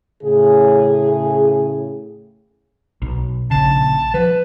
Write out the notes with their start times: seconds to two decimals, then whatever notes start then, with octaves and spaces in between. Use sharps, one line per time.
0.23 A2 C#3 G#4
3.02 B1
3.51 A#1 C#3 A5
4.14 F3 B4